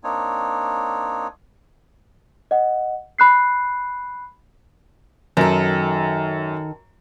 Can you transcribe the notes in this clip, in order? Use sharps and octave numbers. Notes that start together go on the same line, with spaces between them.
A#3 C4 D4 D#4 C#5
D#5 F#5
B5 F#6 C7
F#2 D#3 A4